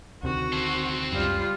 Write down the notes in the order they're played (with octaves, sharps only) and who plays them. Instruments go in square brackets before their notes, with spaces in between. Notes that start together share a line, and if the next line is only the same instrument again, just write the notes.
[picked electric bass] D2 C3 D#3 [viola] F#4
[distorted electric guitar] C4 A4
[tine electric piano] C#2 F#2 [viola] G3 F4